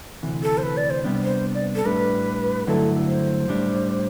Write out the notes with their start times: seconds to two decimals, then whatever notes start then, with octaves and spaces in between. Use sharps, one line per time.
0.23 D2 C3 E3
0.43 A4
0.58 C5
0.63 B4
0.77 D5
0.90 C5
1.04 C3 G3 B3 D4
1.24 C5
1.54 D5
1.76 A4
1.85 A2 G3 D4 B4
2.67 G2 D3 F#3 A3 E4 A4
3.07 C5
3.48 A2 G3 D4